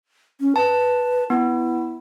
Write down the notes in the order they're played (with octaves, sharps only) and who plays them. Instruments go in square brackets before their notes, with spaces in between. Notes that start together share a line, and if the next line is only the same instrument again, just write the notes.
[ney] C#4
[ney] B4 [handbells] A5
[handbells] B3 [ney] E4